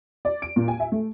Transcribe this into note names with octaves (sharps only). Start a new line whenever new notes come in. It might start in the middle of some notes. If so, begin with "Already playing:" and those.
D5
D7
A#2
G#5
E5
A3